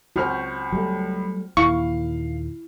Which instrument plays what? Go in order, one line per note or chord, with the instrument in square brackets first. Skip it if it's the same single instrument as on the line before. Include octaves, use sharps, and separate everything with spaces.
[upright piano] C#2 F6 [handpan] F#4 C5
[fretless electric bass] F#3 G3 A3
[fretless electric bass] D#2 A#2 [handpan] E4 [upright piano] F5 [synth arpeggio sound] C#6